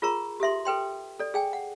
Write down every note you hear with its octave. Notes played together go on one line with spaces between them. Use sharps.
F4 G#4 A#4 A#5 C#6
G4 A4 E5 C6
A4 B4 G5 C6
A4 D5
G#4 G5 G#5
F#5